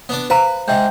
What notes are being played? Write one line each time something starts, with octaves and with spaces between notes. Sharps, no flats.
B3 D4 D5
B4 C5 F5 A#5
G#2 G#3 E5 G5 G6